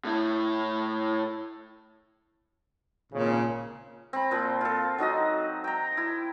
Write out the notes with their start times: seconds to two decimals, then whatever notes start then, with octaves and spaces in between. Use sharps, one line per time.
0.05 A2 E4
3.12 G#1 A#2 C#3
4.13 C4 B5
4.31 A#2 F3
4.61 F4 A4
4.98 F#3 D#4 F#4 D#5
5.64 G5 A#5
5.97 E4